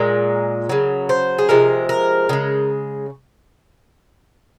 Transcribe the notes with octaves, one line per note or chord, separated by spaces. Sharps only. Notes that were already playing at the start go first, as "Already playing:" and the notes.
Already playing: A#2 G#3 A#4
C#3 F#3
C5
G#4
C3 F3 G#3 A#4
A#4
C#3 G#3